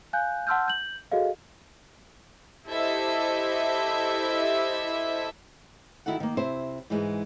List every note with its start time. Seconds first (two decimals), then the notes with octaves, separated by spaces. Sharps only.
0.13 F5 G#5 F#6 G6
0.47 F#5 A5 C6 E6 F6 G6
0.68 G6 F#7
1.11 F#4 G#4 A4 D#5 F5
2.68 E4 G4 A4 C5 D#5 E5
6.06 D#3 E4 F#4 A4 F#5
6.20 D#3 A#3
6.37 C3 E4 C5 E5
6.90 G#2 E3 G#3